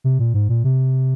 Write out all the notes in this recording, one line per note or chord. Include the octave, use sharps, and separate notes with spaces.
C3
A#2
G#2
A#2
C3